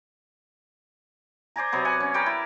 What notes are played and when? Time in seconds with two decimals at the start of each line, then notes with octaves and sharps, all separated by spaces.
1.56 C5 D5 G#5 A#5
1.72 C3 F#3 B3
1.85 F#5 G#5
2.00 C#4
2.14 A#4 B4 D5 G5
2.26 E4